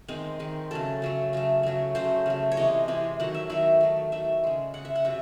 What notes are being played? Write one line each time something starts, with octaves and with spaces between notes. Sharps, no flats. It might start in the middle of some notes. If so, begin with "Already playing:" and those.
D#3 G#3 C4
D#3 G#3
C#3 F#3 A3 A4
C#3 F#3 A3
C#3 F#3 A3
C#3 F#3 A3
C#3 F#3 A3 C5
C#3 F#3 A3
C#5
C3 E3 G#3 D#5
C3 E3 G#3
D#3 F#3 A3 F#5
E5
D#3 F#3 A3 E5
D#3 F#3 A3
D#3 F#3 A3 E5
C#3 G#3
C#3 G#3 F#5
E5
F#5
C3 F#3 E5